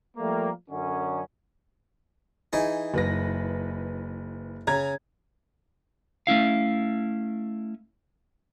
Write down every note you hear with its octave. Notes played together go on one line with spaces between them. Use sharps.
F3 G3 A3 A#3
F#2 D3 C#4
E3 D#4 G#4
F#1 B4 A#6
C#3 A#5 G#6
A3 C#4 E4 F5